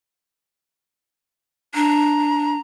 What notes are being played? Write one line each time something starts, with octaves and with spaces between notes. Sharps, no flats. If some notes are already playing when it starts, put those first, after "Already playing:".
D4 A#5